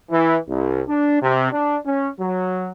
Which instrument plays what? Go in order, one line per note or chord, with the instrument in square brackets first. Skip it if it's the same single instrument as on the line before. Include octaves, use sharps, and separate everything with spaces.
[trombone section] E3
C2
D4
C3
D4
C#4
F#3